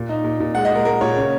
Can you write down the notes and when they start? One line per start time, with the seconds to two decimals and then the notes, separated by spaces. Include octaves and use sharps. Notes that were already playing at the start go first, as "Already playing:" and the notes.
Already playing: A#2
0.09 D#4
0.24 A#2
0.40 A#2
0.55 G#3 F#5
0.65 D#5
0.71 G#3 A#4
0.85 G#3 A#4
1.01 A#2 C#5
1.16 C#3